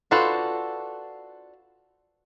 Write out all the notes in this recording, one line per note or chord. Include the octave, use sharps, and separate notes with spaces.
D4 F4 F#4 A4 B4 C5